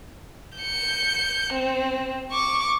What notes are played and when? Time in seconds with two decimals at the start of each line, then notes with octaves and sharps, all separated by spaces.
0.58 G6 C#7
1.53 C4
2.32 C#6 D6